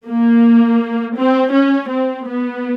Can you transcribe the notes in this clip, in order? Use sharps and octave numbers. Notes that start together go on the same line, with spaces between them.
A#3
C4
C#4
C4
B3